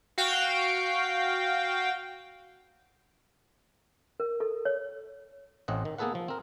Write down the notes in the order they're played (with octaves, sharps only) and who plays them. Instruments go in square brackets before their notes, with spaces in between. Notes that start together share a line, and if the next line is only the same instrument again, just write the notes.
[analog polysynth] F#4 F5 G5
[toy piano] A#4
A4
C#5
[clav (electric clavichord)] A1 A2 C4 D#5 F#5
D#3
A#3 B3 G#4 A4 B4 F#5
F3
C4 A#4